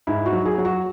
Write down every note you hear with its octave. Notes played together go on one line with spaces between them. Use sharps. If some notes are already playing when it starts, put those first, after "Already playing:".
G#2 E4
F#4
F#3
G#4
F#3
F#4